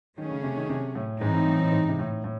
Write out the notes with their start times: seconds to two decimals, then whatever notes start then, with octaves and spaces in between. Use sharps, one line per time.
0.18 D#3 F#3 A3 C#4 G#4
0.31 C#3
0.43 C3
0.56 D#3
0.69 C3
0.95 A2
1.21 G#2 E3 C4 D#4
1.34 A2
1.47 A2
1.59 A2
1.72 G#2
1.89 C3
1.99 A2
2.24 A2